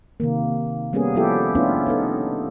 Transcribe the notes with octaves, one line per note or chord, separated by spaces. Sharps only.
C3 D#3 A#3
G3 A#3 B3 C#4 G#4
F3 G3 B3 E4 G4 A4
A3 B3 C#4 D4 E4 F4
B3 D#4 A4